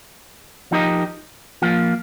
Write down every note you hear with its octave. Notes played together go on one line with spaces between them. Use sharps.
F3 D#4 G4 A#4 D#5
F3 A#3 F4